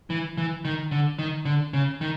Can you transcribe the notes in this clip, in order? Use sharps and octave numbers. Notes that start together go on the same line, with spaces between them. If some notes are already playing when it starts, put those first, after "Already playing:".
E3
E3
D#3
D3
D#3
D3
C#3
D#3